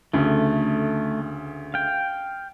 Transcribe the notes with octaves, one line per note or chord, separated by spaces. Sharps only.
D2 C#3 A3
F5 G5